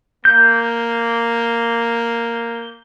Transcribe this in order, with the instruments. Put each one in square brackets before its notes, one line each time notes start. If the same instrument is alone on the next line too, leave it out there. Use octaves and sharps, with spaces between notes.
[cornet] A#3 [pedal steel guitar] G6